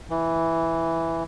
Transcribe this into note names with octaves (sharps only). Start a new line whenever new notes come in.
E3